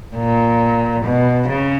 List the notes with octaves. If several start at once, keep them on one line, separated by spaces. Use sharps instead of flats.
A#2
B2
C#3